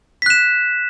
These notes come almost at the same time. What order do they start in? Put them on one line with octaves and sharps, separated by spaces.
B6 F#6 E7